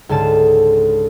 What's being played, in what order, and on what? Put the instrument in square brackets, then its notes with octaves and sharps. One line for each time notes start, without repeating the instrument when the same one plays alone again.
[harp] C#2 G#2 D3 A5 E7